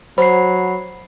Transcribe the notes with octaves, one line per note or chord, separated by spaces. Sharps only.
F#3 C5 B5 C7